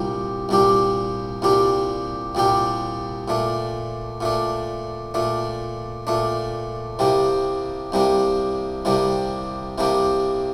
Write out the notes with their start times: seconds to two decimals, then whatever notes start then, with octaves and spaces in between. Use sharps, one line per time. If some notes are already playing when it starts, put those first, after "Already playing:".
Already playing: C2 A#2 G3 G4
0.49 C2 A#2 G3 D4 G4
1.42 C2 A#2 G3 D4 G4
2.35 C2 A#2 G3 D4 G4
3.28 A#2 A3 D4
4.21 A#2 A3 D4
5.14 A#2 A3 D4
6.07 A#2 A3 D4
6.99 C2 C3 G3 A#3 D4
7.92 C2 C3 G3 A#3 D4
8.85 C2 C3 G3 A#3 D4
9.78 C2 C3 G3 A#3 D4